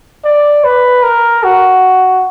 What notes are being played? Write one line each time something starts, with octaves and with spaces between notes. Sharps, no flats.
D5
B4
A#4
F#4